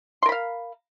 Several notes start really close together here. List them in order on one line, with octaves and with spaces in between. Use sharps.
C6 A#4 B5 F5